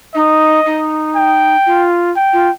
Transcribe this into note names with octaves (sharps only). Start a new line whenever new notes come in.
D#4 D#5
D#4
G5
F4
G5
F4